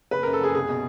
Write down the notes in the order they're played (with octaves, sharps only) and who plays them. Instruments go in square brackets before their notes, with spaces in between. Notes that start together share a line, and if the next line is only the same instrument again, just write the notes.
[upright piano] F#1 B4
F#2 A#4
A4
F#1 G#4
C2 G#4
B2